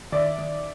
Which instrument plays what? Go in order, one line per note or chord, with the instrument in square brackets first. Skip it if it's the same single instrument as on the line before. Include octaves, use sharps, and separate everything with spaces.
[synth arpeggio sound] D#3 [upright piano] D5 E5
[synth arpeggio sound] D#3